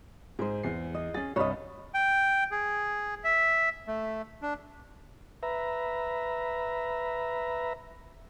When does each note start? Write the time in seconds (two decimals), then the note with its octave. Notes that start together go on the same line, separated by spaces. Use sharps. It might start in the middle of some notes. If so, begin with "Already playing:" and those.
0.39 G#2 G#4 C5
0.63 E2 C7
0.95 D#5
1.14 C#4 G#4 A6
1.36 C2 G2 C#5 D#5 B5
1.94 G5
2.51 G#4
3.24 E5
3.87 A3
4.42 D4
5.43 B4 E5 A#5